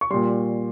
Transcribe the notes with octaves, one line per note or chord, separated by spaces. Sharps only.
C#6
A#2 G3 C6